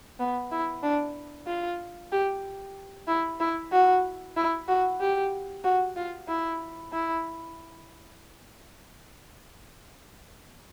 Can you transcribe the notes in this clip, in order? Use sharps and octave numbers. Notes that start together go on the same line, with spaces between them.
B3
E4
D4
F4
G4
E4
E4
F#4
E4
F#4
G4
F#4
F4
E4
E4